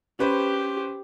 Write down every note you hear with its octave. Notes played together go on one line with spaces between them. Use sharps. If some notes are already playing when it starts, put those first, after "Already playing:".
C#4 G4 B4 C5